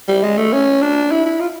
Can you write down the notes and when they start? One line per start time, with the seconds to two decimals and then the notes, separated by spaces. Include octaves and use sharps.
0.08 G3
0.23 G#3
0.37 A3
0.53 C#4
0.82 D4
1.11 E4
1.26 E4
1.40 F4